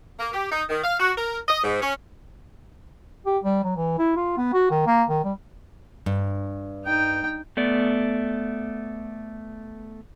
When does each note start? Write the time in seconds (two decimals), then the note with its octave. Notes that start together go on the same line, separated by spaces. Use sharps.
0.19 A#3
0.33 G4
0.51 D#4
0.69 D#3
0.83 F5
0.99 F#4
1.17 A#4
1.48 D#5
1.63 G#2
1.81 C#4
3.26 G4
3.44 G3
3.64 F#3
3.77 E3
3.98 E4
4.16 F4
4.38 B3
4.53 F#4
4.70 D#3
4.86 A#3
5.09 D#3
5.24 G3
6.06 G2
6.85 D#4 G5
7.57 A3 B3 D5